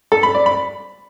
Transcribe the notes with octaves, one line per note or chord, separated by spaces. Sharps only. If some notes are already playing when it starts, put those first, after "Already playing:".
A4
B5
D5
B5